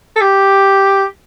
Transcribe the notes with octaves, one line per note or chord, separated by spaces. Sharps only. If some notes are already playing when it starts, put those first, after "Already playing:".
A4
G4